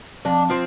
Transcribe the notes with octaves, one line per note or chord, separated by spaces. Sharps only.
F2 D4
F3 C4